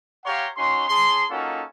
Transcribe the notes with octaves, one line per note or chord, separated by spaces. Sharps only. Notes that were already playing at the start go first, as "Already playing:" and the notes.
G4 C#5 F5 F#5 A#5 C6
C#4 D#4 F#4 C6
C#4 G#4 A5 C6
A#3 C#4 D#4 F4 F#4 A4